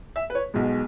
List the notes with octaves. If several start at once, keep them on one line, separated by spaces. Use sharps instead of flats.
E5
B4
C#5
B1 B2 G#3